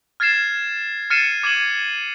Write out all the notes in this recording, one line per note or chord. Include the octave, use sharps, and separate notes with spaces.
F6 G#6 A6 C7 E7
F6 A6 C7 C#7 D#7 E7
D6 G#6 D#7 E7 F#7